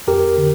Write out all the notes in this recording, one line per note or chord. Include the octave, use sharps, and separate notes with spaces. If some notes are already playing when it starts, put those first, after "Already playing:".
F2 G4 A#4
D3